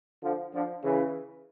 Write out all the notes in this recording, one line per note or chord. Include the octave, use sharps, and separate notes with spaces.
D3 F3
D3 F3
C#3 E3